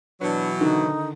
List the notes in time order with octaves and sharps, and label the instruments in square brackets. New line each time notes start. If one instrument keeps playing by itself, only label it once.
[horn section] B2 E3 F#3 [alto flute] D4 [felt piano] B4
[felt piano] D3 D#3 [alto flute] D#4